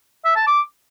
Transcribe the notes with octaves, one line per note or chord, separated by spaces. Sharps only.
E5
A5
D6